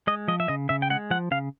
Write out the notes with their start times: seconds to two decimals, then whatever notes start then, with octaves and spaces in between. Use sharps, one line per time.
0.07 G#3 D#5
0.28 F3 D#5
0.40 E5
0.48 C#3 D#5
0.69 C#3 E5
0.82 G5
0.90 G#3 F#5
1.11 F3 F#5
1.31 C#3 F5